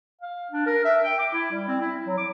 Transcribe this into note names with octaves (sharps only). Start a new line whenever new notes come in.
F5
D4
A#4
E5
G5
D6
E4
G3
C4
E4
F#3
D6